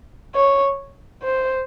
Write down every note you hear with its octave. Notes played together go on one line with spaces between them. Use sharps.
C#5
C5